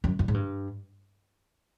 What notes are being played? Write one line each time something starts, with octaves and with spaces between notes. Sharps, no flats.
F#2
F#2
G#2
G2